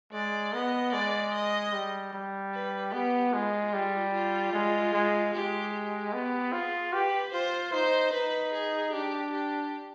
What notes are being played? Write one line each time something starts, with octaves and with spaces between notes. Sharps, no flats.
G#3 D5
B3 D#5
G#3 D5
D#5
G3
G3
B4
B3 G4
G#3 F4
G3
F4
G#3
G#3
G#3 G4
G4
B3
F4 G#4
G4 B4
F4 C5
D#4 C5
D#4 B4
G#4
D4 G4
G4